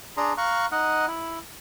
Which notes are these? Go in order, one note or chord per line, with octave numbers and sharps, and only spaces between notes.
D4 G#4 A#5 C6
F5 A#5 C#6 F#6
D#4 D#5 F#5
E4